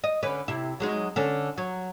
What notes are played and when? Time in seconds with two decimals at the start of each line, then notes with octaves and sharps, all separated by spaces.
0.04 D#5
0.23 D3 C#4 B4
0.48 C3 E4
0.80 F#3 G#3 D#4
1.16 D3 C#4 A4
1.58 F#3